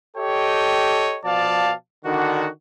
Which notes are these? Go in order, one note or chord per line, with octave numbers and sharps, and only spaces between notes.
G4 A4 C#5 D#5 G5
B2 F3 D5 F5 A5
D3 D#3 D4 F#4